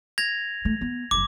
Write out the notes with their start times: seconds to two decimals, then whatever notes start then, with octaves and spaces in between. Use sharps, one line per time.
0.18 G#6 A#6 F7
0.65 A3
0.81 B3
1.11 F1 F#2 D6